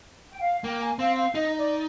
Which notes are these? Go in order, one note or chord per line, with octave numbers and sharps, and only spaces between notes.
G5
F5
A#3 G5
G#5
C4 F5
F5
D#4 D#5
D5